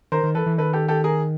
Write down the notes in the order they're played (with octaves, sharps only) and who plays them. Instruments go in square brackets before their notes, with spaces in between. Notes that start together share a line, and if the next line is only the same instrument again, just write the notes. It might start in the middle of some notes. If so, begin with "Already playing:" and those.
[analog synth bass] D#3 [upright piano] A#4 C5
[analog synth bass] D#3
[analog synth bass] E3 [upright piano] A4 B4
[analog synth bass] E3
[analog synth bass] D#3 [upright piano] A4 B4
[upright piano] G4 A4
G4 A4
G#4 A#4